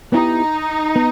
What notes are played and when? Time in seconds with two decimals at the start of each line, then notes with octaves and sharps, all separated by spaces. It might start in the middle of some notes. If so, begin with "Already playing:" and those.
0.13 B3 D#4 E4 G4
0.96 B3